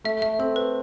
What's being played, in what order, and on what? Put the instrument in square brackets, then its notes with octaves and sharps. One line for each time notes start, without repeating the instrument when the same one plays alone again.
[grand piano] A3 [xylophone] E5
[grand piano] A3 [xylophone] E5
[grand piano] C4 [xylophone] A4
[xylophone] B4